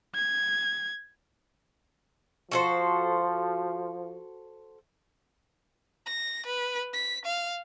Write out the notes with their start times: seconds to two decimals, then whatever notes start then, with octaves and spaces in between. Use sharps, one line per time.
0.16 G#6
2.51 F3 F#4 A4 C5
6.06 A#6
6.46 B4
6.93 B6
7.25 F5